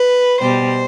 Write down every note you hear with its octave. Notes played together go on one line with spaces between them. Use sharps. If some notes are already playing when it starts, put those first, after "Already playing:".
Already playing: B4
B2 G3 C5